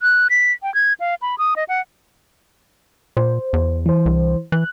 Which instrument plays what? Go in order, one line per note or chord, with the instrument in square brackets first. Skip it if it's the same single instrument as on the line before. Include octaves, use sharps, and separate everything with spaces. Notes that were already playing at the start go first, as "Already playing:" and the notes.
[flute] F#6
B6
G5
G#6
F5
B5
D#6
D#5
F#5
[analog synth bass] A#2 [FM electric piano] C5
[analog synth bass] E2
[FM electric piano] E3 C5
[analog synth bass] C2
[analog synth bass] E3 [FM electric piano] F#6